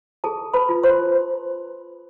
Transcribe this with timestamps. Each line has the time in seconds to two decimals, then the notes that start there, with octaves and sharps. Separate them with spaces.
0.24 G#4 A4 A5
0.54 B4 B5
0.69 F4
0.83 C5 C6